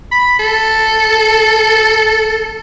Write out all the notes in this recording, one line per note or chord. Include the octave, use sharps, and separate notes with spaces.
B5
A4